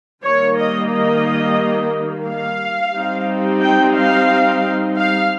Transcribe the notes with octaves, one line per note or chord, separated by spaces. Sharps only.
D#3 G3 A#3 C#5
D#5
D#5
F5
G3 C4 D#4
G5
F5
F5